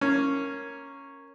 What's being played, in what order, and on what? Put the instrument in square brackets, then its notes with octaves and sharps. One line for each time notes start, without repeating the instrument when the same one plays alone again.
[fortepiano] A#3 C#4